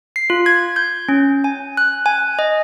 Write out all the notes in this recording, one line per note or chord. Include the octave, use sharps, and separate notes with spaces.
C7
F4
G#6
G6
C#4
G#5
F#6
G#5
D#5